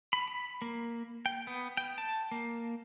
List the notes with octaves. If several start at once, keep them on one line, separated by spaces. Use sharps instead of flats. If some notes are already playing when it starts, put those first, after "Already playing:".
B5
B5
A#3
G5
B3
G5
A5
A#3